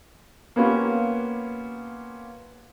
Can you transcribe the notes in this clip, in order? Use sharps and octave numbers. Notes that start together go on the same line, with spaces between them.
A#3 B3 C#4 F4 G4